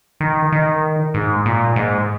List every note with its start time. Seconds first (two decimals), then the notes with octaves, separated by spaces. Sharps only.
0.20 D#3
0.52 D#3
1.14 G#2
1.46 A#2
1.76 G#2